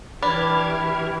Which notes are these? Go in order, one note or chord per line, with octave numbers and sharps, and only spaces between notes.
E3 D4 G4 B4 B5 F6 G#6